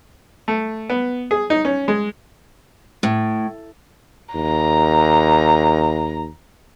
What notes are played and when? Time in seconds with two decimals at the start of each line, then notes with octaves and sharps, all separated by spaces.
0.48 A3
0.90 B3
1.31 G#4
1.50 D#4
1.65 C#4
1.88 G#3
3.03 A2
4.35 D#2 A#5